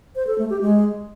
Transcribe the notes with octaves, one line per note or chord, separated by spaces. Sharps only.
C5
A4
A3
G4
G#3